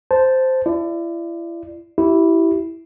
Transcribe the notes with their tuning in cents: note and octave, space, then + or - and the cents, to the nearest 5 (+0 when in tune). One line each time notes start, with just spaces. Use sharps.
C5 -5 A5 +0
E4 +35 D5 +20
E4 -5 G4 -30